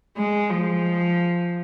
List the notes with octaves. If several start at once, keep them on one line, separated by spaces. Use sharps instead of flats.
G#3
F3